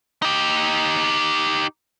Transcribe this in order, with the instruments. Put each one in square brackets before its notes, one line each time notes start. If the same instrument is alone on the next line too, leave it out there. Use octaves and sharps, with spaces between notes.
[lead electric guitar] D#4 G4